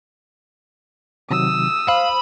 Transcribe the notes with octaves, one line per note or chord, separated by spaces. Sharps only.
C3 D#3 F#3 D#6 E6
C5 F5 B5